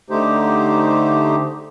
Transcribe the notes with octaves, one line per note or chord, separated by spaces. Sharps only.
D3 A3 D#4 G4 C5